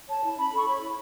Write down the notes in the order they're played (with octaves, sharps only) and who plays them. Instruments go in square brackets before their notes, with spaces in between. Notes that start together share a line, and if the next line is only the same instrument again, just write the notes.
[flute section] C#5 A5
E4
C#4 B5
A4
C#6
C#5 B5
E4